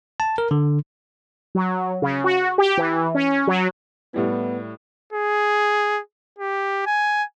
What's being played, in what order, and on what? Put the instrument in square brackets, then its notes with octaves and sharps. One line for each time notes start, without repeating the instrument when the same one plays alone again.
[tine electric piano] A5
A#4
D3
[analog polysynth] F#3
C#3
F#4
G4
E3
C#4
F#3
[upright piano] A2 G3 E4 [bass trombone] B3
[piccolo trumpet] G#4
G4
G#5